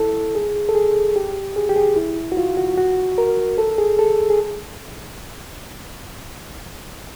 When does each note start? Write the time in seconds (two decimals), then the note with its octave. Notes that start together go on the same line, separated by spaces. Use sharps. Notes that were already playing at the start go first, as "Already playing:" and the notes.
Already playing: E4 A4
0.35 G#4
0.69 A4
0.75 G#4
1.16 G4
1.56 G#4
1.69 G4
1.76 G#4
1.96 E4
2.32 F#4
2.37 F4
2.57 F#4
2.77 F#4
3.18 A#4
3.58 A4
3.78 G#4
3.99 A4
4.30 G#4